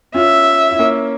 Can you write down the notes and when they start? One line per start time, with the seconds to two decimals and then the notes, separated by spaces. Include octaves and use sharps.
0.15 C#4 F4 E5
0.71 E4
0.79 A#3 C#4